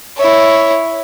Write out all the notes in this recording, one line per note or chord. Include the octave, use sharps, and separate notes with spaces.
E4 C#5